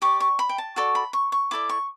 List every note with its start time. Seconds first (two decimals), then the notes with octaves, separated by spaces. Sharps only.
0.02 G4 D5 C#6
0.20 C#6
0.39 B5
0.49 G5
0.58 A5
0.76 F#4 A4 D5 C#6
0.95 B5
1.13 C#6
1.32 C#6
1.51 E4 A4 D5 D6
1.69 C#6